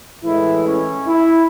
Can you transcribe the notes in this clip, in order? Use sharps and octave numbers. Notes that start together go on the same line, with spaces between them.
A2 E3 G#3 E4
C#4
E4